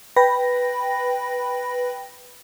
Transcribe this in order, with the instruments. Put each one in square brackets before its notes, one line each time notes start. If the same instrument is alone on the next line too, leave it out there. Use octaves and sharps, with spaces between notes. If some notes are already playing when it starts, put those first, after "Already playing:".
[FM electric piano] B4 G5 B5 A#6